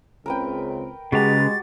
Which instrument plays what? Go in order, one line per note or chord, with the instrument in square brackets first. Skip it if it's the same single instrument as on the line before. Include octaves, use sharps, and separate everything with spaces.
[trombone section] C#2 C#3 C4 [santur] A#4 B4 G5
[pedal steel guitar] C#3 B4 A#5 [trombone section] G#3 [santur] F#4 G4 [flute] A6